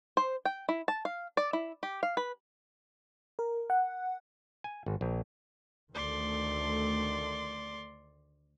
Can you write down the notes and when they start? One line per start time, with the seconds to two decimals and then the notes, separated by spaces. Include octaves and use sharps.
0.17 C5
0.45 G5
0.69 E4
0.88 A5
1.05 F5
1.37 D5
1.53 E4
1.83 G4
2.03 F5
2.17 B4
3.39 A#4
3.70 F#5
4.64 G#5
4.86 G#1
5.01 A#1
5.95 D2 D#3 A3 D5 C6